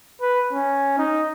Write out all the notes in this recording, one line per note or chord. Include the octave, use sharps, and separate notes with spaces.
B4
C#4
D#4